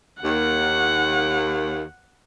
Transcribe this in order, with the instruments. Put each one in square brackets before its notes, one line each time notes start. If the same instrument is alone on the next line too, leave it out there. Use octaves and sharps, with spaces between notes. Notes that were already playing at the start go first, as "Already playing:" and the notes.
[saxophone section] D#2 [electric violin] F#5